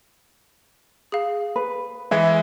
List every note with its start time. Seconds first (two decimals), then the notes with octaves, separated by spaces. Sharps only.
1.12 G#4 F5
1.56 B4
2.11 E3 G#3 E4 E5